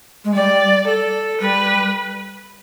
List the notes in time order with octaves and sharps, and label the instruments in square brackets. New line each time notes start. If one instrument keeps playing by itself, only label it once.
[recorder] G#3
[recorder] G3 [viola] D5
[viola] A4
[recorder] G3 [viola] B4